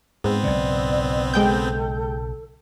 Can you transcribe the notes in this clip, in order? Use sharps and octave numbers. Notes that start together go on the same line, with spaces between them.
G#2 B3 C4
B1 C#3 D5
G#3 A4 G5 G6